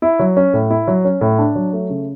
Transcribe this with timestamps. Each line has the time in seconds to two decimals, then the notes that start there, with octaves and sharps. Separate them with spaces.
0.02 E4
0.19 F#3
0.37 C#4
0.54 A2
0.70 E4
0.87 F#3
1.05 C#4
1.21 A2
1.39 D4
1.56 F#3
1.73 A3
1.90 C#3